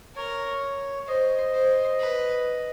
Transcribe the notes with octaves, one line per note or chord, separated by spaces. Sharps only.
A#4 C#5
C5 D#5
C5
B4